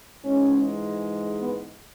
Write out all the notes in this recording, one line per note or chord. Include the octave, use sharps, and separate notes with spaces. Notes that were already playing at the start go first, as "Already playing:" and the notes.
G#2 E3 G#3 C#4
B3